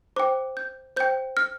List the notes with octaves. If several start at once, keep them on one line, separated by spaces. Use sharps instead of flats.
C5 G5 D6
G6
C5 G5 G6
F6